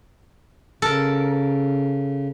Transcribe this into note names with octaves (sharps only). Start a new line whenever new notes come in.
C#3 A4 A#4